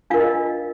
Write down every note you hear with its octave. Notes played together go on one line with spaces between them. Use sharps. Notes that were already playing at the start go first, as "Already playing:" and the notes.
D4 F4 A#4 F5
D#5